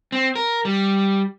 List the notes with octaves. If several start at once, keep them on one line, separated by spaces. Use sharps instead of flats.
C4
A#4
G3